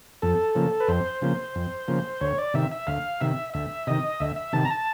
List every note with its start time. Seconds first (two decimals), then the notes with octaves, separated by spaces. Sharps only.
0.22 F2 A4
0.55 C#3 F3 A#3
0.80 B4
0.88 F2 C5
1.22 C#3 F3 A#3
1.55 F2
1.88 C#3 F3 A#3
2.21 D2 C#5
2.38 D5
2.54 C3 D#3 E5
2.71 E5
2.87 D2 F5
3.21 C3 D#3 E5
3.54 D2 E5
3.87 C3 D#3 D#5
4.20 D2 E5
4.36 E5
4.53 C3 D#3 A5
4.65 A#5
4.70 A5